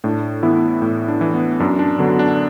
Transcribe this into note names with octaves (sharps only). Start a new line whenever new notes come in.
A2 D4
E3 B3 E4
A2
D4
E3
B3
F#2 D4
D4
D3 F#3 B3
D4